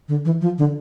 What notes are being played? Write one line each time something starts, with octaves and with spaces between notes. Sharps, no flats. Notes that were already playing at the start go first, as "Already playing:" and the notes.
D3
E3
F3
D3